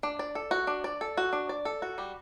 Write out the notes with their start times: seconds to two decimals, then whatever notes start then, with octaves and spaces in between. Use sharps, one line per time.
0.03 D4
0.19 D5
0.35 A4
0.51 F#4
0.67 D4
0.84 D5
1.01 A4
1.17 F#4
1.33 D4
1.49 D5
1.65 A4
1.82 F#4
1.98 G3